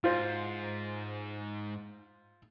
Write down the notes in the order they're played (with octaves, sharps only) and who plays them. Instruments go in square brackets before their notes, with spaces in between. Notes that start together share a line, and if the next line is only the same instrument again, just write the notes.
[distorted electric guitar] G#2 [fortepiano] F4 C5